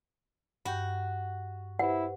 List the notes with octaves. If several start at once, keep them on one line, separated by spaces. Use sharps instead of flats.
G2 F#4 G5 G6
E4 G4 B4 C5 F#5